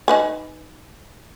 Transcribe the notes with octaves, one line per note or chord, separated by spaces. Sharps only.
D#4 B4 G#5